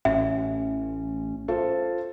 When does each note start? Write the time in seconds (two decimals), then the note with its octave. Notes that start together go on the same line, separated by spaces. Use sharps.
0.05 A1 C#4 E5
1.48 F4 A4 C5